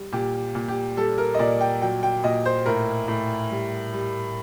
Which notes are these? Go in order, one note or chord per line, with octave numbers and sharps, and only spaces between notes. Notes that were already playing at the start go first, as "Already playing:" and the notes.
Already playing: G3
A#2 G4
A#2
G4
G3 A4
A#4
D#5
A#2 D5
G5
F#3 G5
G5
A#2 D#5
C5
A2 A#4
A2
G3
G3